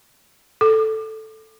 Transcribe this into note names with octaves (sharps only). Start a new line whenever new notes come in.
A4